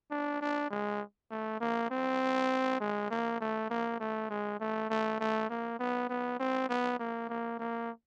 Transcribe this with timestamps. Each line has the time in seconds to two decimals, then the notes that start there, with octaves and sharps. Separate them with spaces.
0.11 D4
0.41 D4
0.71 G#3
1.31 A3
1.61 A#3
1.91 C4
2.81 G#3
3.10 A#3
3.41 A3
3.70 A#3
4.00 A3
4.30 G#3
4.60 A3
4.90 A3
5.20 A3
5.50 A#3
5.79 B3
6.09 B3
6.40 C4
6.69 B3
6.99 A#3
7.29 A#3
7.59 A#3